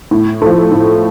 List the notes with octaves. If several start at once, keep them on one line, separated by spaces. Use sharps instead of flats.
A2
F3 A3
A2